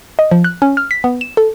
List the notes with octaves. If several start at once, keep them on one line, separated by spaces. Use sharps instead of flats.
D#5
F3
F#6
C#4
F6
B6
B3
E7
A4